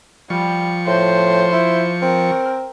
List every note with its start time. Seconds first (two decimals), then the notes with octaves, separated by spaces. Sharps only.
0.30 F3 G3 C#6
0.87 A2 C5
1.52 E4
2.02 C4 A#4